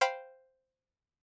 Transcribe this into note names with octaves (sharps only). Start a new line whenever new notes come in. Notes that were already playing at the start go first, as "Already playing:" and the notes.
C5 F5 G5 B5